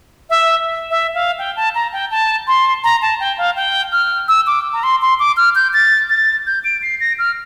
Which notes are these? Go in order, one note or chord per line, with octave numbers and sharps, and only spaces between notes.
E5
E5
F5
G5
A5
A#5
G5
A5
C6
A#5
A5
G5
F5
G5
F6
E6
D6
A#5
C6
C6
D6
F6
G6
A6
A6
G6
D7
C7
A#6
F6